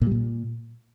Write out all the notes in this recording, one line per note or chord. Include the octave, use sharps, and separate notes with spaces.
A#2
G3
A#2